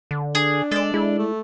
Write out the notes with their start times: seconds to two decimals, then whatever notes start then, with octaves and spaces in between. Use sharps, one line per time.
0.11 D3
0.35 D4 G#4
0.71 G#3 A4 D5
0.94 G#3 E4
1.18 A3